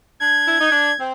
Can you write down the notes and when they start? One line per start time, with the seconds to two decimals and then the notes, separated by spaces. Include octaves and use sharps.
0.20 D4 G#6
0.46 E4
0.59 D#4
0.71 D4
0.98 C4